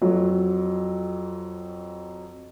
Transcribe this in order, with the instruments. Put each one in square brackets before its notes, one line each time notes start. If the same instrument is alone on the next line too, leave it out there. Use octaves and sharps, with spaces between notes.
[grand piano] F2 F#3